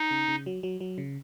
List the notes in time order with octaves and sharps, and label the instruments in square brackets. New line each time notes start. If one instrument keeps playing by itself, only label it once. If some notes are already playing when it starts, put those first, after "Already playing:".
Already playing: [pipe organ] D#4
[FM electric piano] C#3
C#3
F#3
F#3
F#3
C#3